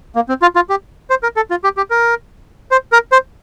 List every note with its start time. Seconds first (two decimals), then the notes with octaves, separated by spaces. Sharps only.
0.15 A#3
0.29 C4
0.42 F4
0.56 F4
0.69 G4
1.10 C5
1.23 A#4
1.36 A4
1.50 F4
1.64 G4
1.77 G4
1.90 A#4
2.71 C5
2.92 A#4
3.12 C5